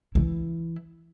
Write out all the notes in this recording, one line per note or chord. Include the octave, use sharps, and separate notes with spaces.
E3 E4